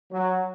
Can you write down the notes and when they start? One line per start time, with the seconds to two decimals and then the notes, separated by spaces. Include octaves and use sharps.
0.11 F#3